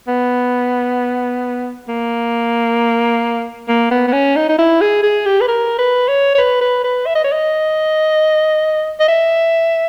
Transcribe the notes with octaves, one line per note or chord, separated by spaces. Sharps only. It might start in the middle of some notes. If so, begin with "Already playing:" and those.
B3
A#3
A#3
B3
B3
C#4
D#4
D#4
E4
G#4
G#4
G4
B4
A#4
B4
C#5
C#5
B4
B4
B4
E5
D#5
C#5
D#5
D#5
E5